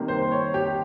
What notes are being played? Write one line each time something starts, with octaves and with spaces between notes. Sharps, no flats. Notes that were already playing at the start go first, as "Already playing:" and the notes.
Already playing: C3 D#3 G3 A#3
C5
C#5
G4